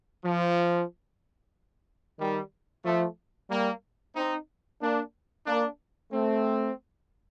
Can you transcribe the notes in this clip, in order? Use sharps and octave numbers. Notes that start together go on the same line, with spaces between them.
F3
D#3 G3
F3 A3
G3 A#3
C4 D#4
A#3 D4
A#3 D4
A3 C4